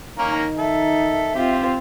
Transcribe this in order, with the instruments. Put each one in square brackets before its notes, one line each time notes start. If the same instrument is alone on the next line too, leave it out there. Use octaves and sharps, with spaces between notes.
[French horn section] D#3 D#4 [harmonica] A#3 C#4 A#4
[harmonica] A4 [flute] E5
[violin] C4 F4 [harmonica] G4